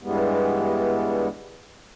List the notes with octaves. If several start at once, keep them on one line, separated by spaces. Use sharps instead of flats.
G2 E3 G3 G#3 B3